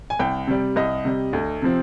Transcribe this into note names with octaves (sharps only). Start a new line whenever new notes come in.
G#5
C2 G5
C3 G3
C2 D#5
C3 G3
D2
C3 F3 C4